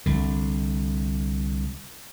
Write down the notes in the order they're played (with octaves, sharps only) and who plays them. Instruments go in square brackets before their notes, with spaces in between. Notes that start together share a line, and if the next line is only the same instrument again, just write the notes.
[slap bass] C2 D3